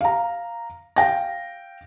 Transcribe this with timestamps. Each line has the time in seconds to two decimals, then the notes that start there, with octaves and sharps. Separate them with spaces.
0.01 F5 A#5
0.96 F5 G5 A#6